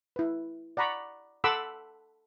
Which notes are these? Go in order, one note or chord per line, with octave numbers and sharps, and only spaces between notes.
E4 B4
D5 F#5 A#5 B5 C#6
A4 F#5 B5 C6 D6 E6